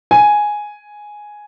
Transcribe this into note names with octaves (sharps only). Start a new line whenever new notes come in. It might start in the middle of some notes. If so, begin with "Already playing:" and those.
G#5